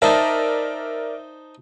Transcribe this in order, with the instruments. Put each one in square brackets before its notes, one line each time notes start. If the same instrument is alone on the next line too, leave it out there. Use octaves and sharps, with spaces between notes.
[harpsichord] D#4 C5 A5 [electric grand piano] A#4 D5 [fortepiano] E5